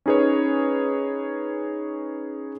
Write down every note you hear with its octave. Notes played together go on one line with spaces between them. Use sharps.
C#4 D#4 G#4 B4 C#5